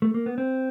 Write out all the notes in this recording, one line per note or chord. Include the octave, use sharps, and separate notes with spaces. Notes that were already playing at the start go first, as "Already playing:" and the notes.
A3
A#3
B3
C4